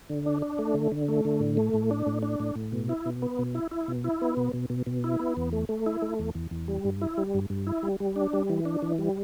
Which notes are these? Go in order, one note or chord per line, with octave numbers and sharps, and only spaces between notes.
D3
D4
D4
A3
D3
D3
A3
D3
A2
A3
A2
D4
A2
D4
A2
A2
B2
E4
B2
B3
B2
E4
E4
B2
E4
B3
B2
B2
B2
B2
E4
B3
E2
A3
A3
E4
A3
E2
E2
E2
G3
G2
E4
G3
G2
G2
E4
G3
G3
D4
G3
E3
D4
E3
G3